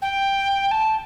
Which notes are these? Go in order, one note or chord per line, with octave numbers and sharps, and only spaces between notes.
G5
A5